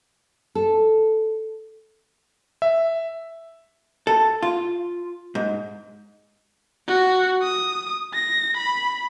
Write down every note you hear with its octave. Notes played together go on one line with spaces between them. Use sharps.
A4
E5
A4
F4
G#2
F#4
D#6
A#6
B5